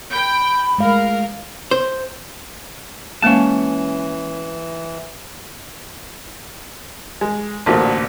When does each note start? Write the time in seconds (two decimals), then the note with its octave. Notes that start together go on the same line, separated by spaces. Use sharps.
0.13 G5 B5
0.78 G#3 A3 A#4 F5
1.71 C5
3.22 E3 G#3 A#3 C#4 F5 A5
7.21 G#3
7.66 A1 D2 A#2 F#4 C5 A5